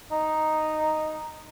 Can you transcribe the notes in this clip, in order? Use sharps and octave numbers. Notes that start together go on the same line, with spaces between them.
D#4